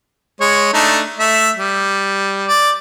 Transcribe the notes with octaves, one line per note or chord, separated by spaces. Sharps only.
G#3 C#5
A3 D4 D#4
A3 E5
G3
D5